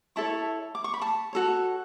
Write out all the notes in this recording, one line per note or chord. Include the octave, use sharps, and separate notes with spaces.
E4 A4 C#5 A5 C#6
D6
C#6
B5
A5 C#6
F#4 A4 C#5